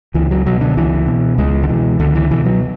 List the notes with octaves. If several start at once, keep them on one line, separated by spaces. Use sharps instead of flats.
C#2 E3
F#3
B2 F#3
D3
C#2 E3
B2
C#2 G#3
D3
B2 E3
C#2 D3
E3
B2 E3
F#3